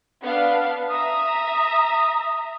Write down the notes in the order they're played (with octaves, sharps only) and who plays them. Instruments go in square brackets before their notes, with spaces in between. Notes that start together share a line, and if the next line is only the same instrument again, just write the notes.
[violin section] B3 D4 F5
[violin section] E5 A#5 [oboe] D#6